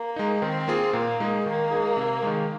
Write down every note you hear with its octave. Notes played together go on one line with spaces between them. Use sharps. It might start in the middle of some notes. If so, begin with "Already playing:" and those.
Already playing: A#3
G#3 D#4
D#3 C4
A#3 F4 G#4
A#2 A#3
G#3 D#4 G#4
D#3 A#3
G#3 D#4 G#4
C3
D#3 G#3